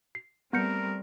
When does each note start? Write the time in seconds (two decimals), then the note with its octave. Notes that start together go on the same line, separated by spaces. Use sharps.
0.15 C7
0.53 G3 A3 B3 C4 A#4 G6 C#7